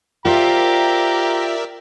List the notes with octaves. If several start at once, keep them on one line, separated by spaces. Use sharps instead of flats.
F4 G4 A#4 C5 D5 E5 A#5